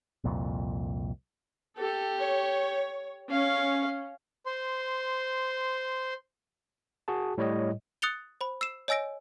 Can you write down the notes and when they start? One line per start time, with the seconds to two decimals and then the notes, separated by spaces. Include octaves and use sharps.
0.24 C2 F2 A#2
1.78 G4 A4
2.20 C#5
3.31 C#4 F5
4.46 C5 C6
7.08 F#4 G#4 A5
7.38 A2 G3 C#5 D#5
8.02 D#6 F#6 A6 C#7 F7 G7
8.41 C5 B5
8.61 E6 C7 E7
8.88 C#5 D#5 G#5 E6 A#6 D7